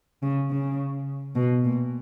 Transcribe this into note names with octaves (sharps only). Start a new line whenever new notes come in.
C#3
C#3
B2
A#2